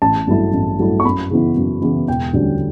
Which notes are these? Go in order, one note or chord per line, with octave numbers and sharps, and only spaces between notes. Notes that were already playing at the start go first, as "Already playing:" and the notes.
A1 A5
G2 F#3 A3 E4
A1
G2 F#3 A3 E4
C#6
F#2 B5
C#3 E3 B3 E4
F#2
C#3 E3 B3 E4
E1 G5
D2 D3 G3 C#4